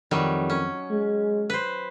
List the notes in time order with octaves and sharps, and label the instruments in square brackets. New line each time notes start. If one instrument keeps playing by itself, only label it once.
[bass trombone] F2 [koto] D#3 F#3 G3
[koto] C#4
[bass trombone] G#3
[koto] B4 C5